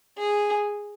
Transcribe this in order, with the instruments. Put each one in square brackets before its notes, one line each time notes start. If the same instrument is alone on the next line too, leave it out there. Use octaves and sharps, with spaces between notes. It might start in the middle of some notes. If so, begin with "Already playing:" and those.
[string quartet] G#4